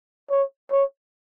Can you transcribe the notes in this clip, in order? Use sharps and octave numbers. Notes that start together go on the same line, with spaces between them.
C#5
C#5